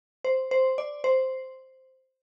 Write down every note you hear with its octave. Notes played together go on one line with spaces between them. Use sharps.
C5
C5
D5
C5